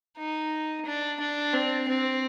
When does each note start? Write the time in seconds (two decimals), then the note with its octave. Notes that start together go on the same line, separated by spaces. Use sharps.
0.18 D#4
0.86 D4
1.20 D4
1.54 C4
1.88 C4